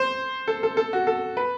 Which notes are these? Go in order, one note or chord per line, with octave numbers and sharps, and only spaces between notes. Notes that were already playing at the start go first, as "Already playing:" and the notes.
Already playing: C5
A4
A4
A4
F#4
A4
B4